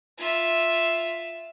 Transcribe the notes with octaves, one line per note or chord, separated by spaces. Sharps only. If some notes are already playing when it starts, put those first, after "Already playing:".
F4 E5